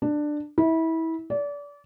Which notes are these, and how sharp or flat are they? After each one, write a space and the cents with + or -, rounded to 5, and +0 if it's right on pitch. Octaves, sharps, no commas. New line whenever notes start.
D4 +15
E4 -25
D5 -30